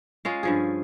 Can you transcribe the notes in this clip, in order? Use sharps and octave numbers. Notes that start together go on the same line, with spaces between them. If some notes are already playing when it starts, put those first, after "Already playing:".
G#3 C#4 F4
G2 F3 G#4